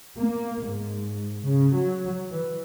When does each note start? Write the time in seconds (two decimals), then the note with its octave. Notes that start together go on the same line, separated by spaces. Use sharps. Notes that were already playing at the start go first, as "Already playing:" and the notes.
0.18 A#3
0.64 G#2
1.45 C#3
1.74 F#3
2.31 E3